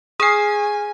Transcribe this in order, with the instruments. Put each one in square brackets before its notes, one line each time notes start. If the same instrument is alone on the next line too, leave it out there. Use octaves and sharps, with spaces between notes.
[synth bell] G#4 F6 [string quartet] G#5 [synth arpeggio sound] D#6 C7